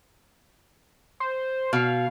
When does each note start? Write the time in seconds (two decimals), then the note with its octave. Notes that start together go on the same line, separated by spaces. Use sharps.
1.20 C5
1.73 B2 F5